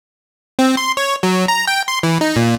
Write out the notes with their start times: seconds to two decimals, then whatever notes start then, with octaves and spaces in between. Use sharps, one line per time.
0.59 C4
0.77 C6
0.97 C#5
1.23 F#3
1.48 A#5
1.67 G5
1.88 C6
2.03 E3
2.21 D#4
2.36 A#2